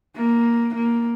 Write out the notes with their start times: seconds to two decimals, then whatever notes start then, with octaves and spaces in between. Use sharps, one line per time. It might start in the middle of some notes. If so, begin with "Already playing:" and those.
0.16 A#3
0.75 A#3